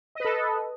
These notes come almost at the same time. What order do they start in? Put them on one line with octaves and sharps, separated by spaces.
D#5 B4 A4